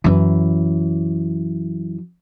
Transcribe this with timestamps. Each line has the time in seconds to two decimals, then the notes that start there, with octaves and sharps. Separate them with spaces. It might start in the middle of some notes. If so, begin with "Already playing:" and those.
0.04 F#2 E3